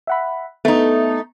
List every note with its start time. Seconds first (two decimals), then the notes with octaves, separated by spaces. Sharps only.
0.07 E5 F#5 B5
0.65 A3 B3 D#4